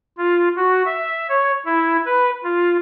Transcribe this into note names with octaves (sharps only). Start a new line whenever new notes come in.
F4
F#4
E5
C#5
E4
B4
F4